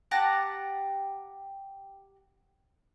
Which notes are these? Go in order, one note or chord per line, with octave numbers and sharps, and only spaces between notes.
G4 F#5 A5 A#5